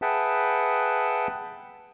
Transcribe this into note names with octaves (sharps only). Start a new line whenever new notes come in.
G#4 B4 E5 F#5 G5 A5